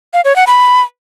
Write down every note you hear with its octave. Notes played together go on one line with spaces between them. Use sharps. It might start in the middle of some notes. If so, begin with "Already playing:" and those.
F5
C#5
F#5
B5